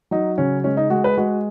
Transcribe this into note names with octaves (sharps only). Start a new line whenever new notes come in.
F#3 D#4
C#3 C#4
G#3 C#4
D#4
G#3 F#4
B4
G#3 F#4